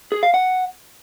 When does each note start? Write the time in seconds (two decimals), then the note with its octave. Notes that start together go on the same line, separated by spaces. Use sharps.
0.12 G#4
0.23 F5
0.34 F#5